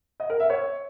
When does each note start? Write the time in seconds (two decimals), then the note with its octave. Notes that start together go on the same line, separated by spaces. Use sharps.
0.20 D#5
0.30 A#4
0.40 E5
0.50 C#5